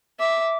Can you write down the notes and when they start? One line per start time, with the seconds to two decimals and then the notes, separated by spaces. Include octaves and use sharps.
0.20 E5 D6